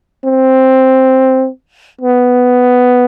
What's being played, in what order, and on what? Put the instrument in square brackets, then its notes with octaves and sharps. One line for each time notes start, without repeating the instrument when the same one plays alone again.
[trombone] C4
B3